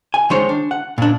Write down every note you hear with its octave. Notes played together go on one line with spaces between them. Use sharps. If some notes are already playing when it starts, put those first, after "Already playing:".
G#5
D#3 G#3 D#4 C5 C#5
D4
F#5
A#2 D4